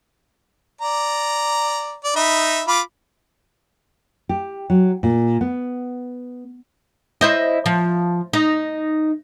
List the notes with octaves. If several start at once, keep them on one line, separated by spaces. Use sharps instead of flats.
D5 A#5
D5
D#4 E5 B5
F4 B5 D6
G4
F#3
A#2
B3
E4 C5 D#5
F3
D#4